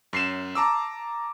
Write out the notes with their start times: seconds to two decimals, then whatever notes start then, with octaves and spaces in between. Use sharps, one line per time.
0.13 F#2 C7 E7
0.55 A5 A#5 D6 E6